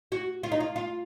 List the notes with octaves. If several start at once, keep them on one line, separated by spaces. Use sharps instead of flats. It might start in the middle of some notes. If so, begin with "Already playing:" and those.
F#4
F4
D#4
F4
F4